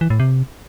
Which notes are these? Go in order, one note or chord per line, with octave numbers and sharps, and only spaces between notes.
E3
A2
C3